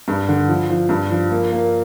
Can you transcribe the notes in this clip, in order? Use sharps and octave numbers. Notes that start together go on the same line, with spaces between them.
G2
D3
F3
F3
G2
F3
A#3
A#3